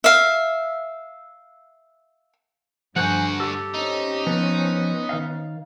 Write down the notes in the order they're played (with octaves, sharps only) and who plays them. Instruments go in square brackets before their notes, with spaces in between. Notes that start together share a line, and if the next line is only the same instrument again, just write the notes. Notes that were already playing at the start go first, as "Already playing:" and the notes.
[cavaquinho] E5 F5
[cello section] G2 [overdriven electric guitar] D3 F#4 [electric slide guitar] F3 C5 G#5 [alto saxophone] F#5
[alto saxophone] G4 [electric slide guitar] A4
[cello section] C4 C#4 [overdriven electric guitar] D#4
[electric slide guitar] F3 [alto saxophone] B3
[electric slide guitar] D#3 F5